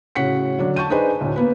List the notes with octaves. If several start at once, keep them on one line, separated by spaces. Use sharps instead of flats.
A2 C#3 F#4 F#5 B6 C#7
D3 F#3 D4
A5 C#6 G6 D#7
D4 D#4 G#4 B4 C5 G#5
D2 A2
A#3 B3 B4